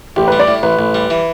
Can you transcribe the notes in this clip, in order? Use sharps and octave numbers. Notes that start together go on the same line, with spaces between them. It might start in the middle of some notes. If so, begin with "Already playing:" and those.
A1 G4
G3 B4
D5
A2
A1 B4
A1
G3
E3